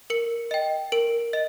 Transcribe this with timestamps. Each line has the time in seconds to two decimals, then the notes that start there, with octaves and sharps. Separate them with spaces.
0.10 A#4 C#7
0.51 D#5 G5
0.92 A#4 D7
1.33 D#5